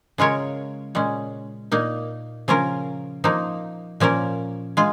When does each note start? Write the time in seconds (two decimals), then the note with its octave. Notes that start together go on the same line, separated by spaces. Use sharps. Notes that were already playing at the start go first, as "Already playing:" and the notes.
0.18 C#3 G#3 F4 A#4 C#5
0.95 A#2 G#3 C#4
1.72 A#2 A#3 D#4
2.48 C#3 F3 C#4 F4 A#4
3.24 F3 A#3 D#4
4.00 A#2 F3 A#3 C#4 A#4
4.77 G#3 F4